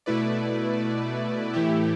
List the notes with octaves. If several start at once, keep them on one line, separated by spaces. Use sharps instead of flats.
B2 A3 E4 B4 D5
A2 E3 A3 E4 G4